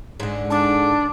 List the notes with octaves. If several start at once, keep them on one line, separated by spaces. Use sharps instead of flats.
G#2 D3
D4 A5 D6